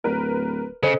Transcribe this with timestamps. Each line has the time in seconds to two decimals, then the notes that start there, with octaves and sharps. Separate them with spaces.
0.04 D1 A#4 B4
0.83 C#3 A4 C5 D#5